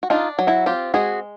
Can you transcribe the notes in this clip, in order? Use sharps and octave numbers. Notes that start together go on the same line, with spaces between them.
F#4
D4 D#4 F4
F#3
E4 F#4
C4 F4 G4
G#3 F#4 G#4